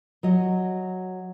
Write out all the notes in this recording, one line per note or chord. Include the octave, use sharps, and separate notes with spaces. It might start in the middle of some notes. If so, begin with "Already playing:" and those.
F#3 D#5